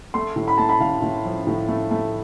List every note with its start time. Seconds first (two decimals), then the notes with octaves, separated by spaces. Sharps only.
0.14 A3 C6
0.36 A2
0.48 B5
0.58 A3 A5
0.69 B5
0.80 A2 F5
1.02 A2
1.25 F3
1.47 A2
1.68 A3
1.91 A3